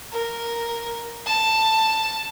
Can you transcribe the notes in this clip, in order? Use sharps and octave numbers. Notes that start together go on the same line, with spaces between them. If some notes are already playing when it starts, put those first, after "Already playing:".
A#4
A5